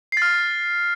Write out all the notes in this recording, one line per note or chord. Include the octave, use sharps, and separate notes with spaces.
F6 A6 C7